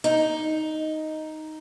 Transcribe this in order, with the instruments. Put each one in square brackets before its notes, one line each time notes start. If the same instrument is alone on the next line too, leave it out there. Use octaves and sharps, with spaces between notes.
[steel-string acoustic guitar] D#4